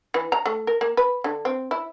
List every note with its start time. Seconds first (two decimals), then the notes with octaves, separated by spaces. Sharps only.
0.14 E3
0.32 A#5
0.46 A3
0.67 A#4
0.81 A#3
0.97 B4
1.24 D3
1.45 C4
1.71 E4